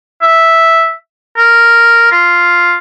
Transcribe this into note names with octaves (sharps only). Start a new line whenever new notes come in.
E5
A#4
F4